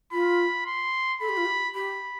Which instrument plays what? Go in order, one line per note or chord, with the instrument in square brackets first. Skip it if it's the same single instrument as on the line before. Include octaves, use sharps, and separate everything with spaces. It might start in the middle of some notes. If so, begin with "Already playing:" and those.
[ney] F4 [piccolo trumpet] B5
[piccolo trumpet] C6
[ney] A4 [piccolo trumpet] B5
[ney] G4
F4
G4
[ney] G4 [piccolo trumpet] B5